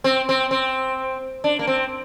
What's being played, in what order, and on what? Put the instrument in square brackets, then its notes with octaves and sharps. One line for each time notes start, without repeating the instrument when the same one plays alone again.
[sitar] C4
C4
C4
D4
A#3
C4